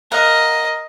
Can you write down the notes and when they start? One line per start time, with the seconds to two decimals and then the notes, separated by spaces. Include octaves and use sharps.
0.12 A#4 D#5 F5 F#5